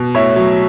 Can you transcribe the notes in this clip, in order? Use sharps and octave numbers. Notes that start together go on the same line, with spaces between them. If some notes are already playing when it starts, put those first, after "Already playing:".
Already playing: B2
A2 C#5 E5
F#3